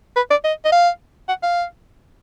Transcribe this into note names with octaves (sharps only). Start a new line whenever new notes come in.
B4
D5
D#5
D#5
F5
F#5
F5